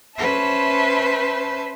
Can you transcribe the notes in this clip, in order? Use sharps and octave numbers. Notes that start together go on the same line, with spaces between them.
C#4 B4 C5 E5 A5